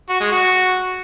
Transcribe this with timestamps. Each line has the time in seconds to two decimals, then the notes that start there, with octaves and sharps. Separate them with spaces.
0.10 F#4
0.21 G#3
0.32 F#4